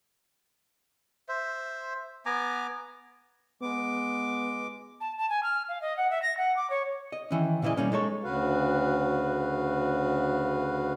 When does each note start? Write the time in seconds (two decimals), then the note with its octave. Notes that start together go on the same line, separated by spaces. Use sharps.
1.28 C5 E5
2.26 B3 G#5 A#5 D6
3.62 G#3 B3 D6
5.01 A5
5.18 A5
5.30 G#5
5.43 F6
5.69 F5
5.82 D#5
5.97 F#5
6.11 E5
6.22 A#6
6.37 F#5
6.56 D6
6.70 C#5
7.12 D#5
7.31 D#3 E3 C#4
7.62 A#2 C#3 E3 E4 D#5
7.77 B2 G3 A#3 C#4
7.92 G#3 D#4 A4 C#5
8.23 D2 C#3 F#4 B4 F5